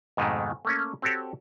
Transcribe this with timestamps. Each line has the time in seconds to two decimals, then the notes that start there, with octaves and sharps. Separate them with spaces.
0.17 F2 G#2 B2 D#3 G#3 A3
0.65 A3 A#3 C#4
1.02 C4 F#4 G4 A4 C#5